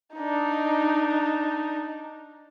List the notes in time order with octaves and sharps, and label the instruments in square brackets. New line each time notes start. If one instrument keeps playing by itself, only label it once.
[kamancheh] D4 D#4